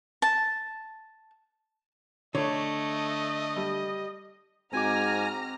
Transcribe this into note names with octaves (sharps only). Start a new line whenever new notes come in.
A5
D3 A3 C#5 D#5
G3
G#2 C4 F#4 G#5 A#5 D6 F6 A#6